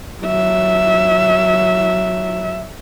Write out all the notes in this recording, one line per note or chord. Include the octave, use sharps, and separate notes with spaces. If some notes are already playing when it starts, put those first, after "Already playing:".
F#3 E5